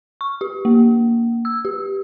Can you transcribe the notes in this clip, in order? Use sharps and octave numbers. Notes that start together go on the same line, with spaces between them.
C#6
G4
A#3
E6
G4